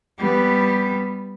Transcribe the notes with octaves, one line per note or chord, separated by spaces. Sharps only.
G3 B3